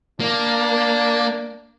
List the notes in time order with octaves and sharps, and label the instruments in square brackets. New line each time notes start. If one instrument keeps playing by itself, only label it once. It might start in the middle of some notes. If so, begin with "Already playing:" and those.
[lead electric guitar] A#3 [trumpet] D4